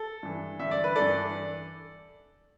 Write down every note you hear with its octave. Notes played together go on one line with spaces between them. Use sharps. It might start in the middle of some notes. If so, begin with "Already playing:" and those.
Already playing: A4
G2 E3
G2 D3 E5
D5
B4
G2 E3 A4 D5